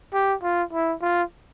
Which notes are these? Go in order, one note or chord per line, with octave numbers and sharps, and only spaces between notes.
G4
F4
E4
F4